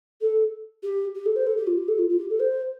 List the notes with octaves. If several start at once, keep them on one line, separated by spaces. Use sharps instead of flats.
A4
G4
G4
A4
C5
A4
G4
F4
G4
A4
F4
F4
G4
A4
C5